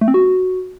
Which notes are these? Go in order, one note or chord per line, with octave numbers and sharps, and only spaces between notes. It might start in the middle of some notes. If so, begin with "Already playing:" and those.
A3
C4
F#4